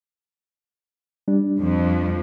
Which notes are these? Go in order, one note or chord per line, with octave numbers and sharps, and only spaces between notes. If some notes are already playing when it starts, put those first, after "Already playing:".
G3 D4
F2 F3